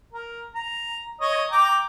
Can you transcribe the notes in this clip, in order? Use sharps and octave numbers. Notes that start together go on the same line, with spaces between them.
A#4
A#5
C#5 D#5 D#6
G5 A#5 D6